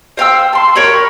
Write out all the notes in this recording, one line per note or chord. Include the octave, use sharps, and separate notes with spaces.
C5 F5 G5 E6
A5 C6
A#4 C#5 G5 B5